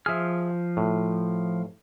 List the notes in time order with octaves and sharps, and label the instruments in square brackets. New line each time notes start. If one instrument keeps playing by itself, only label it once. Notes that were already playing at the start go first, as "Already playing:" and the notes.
[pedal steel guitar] F3 F6 [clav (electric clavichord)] G#4 E5
[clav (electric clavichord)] A2